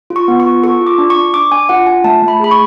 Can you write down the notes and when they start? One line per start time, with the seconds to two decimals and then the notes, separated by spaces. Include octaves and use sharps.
0.10 F4
0.16 C#6
0.28 B3
0.40 C#6
0.46 F4
0.63 A4 C#6
0.81 F4
0.87 D6
0.98 D4
1.10 C#6
1.16 D4
1.33 D4 D6
1.52 D4 G#5
1.69 F4 F#5
1.87 F4 G#5
2.04 A3 A5
2.22 A3
2.28 B5
2.40 G#4 B5
2.51 C#6